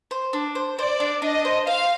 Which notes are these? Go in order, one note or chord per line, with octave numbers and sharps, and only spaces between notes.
C5
D4
C5
C5 D5
D4
D4 D#5
C5
C5 F5